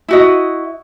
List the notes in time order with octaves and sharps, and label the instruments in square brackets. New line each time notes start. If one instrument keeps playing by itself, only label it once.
[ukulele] E4 F#4 D#5